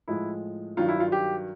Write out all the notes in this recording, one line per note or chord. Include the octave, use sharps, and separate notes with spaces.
A2 F3 G#3 E4
G2 D#3 F#3 F4
E4
F4
G4